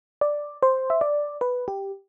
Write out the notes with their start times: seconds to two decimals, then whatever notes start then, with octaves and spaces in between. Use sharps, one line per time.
0.21 D5
0.63 C5
0.90 E5
1.01 D5
1.41 B4
1.68 G4